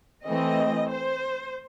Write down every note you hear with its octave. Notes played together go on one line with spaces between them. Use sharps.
E3 A3 C4 D#5
C5